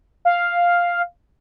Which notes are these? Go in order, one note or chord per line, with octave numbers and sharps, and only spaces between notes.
F5